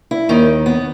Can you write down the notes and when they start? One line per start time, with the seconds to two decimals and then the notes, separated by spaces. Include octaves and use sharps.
0.11 E4
0.29 D#2 D#3 D#4
0.66 B3